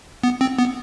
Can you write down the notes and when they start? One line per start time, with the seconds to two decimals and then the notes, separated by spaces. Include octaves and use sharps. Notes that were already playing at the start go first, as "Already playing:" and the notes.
0.24 B3
0.41 C4
0.59 B3